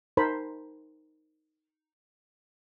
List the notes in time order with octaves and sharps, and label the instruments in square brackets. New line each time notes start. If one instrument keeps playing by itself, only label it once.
[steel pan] D#4 A#4 C5 A5 B5